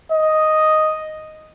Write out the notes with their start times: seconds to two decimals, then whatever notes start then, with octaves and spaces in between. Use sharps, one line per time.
0.12 D#5